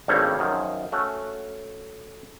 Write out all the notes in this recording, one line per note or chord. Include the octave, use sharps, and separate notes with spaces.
G#1 G2 G3 A3 A#3 C#5
F#2 D#3 F3
A3 C#4 F#4